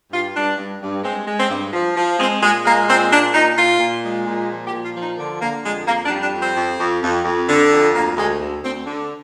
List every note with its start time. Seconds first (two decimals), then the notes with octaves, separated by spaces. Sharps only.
0.12 G2 F4
0.35 G2 D4
0.58 G2
0.81 G2
1.04 G#3 C4
1.27 G#3
1.39 C4
1.50 G2
1.73 F3
1.96 F3
2.19 G#3 C4
2.42 A#2 G#3
2.65 G#3 A#3
2.88 A#2 C4
3.11 A#2 D4
3.34 A#2 D#4
3.57 A#2 F4
3.80 A#2
4.03 G#3
4.27 A#2
4.50 F3
4.66 G4
4.72 A#2
4.84 F4
4.95 F3
5.01 D#4
5.19 D3
5.41 D3 A#3
5.64 F2 G#3
5.87 F2 A#3
6.05 D4
6.10 G3
6.21 D4
6.33 F2
6.40 C4
6.56 F2
6.79 F2
7.03 F2
7.25 F2
7.48 D3
7.71 F2
7.94 D2 A#3
8.17 D2 G#3
8.40 D2
8.63 D2 C4
8.86 D3